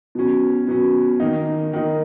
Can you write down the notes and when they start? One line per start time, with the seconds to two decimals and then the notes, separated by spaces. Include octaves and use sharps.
0.15 B2 F#3 C#4
0.68 B2 F#3 C#4
1.20 D#3 A#3 D#4
1.73 D#3 A#3 D#4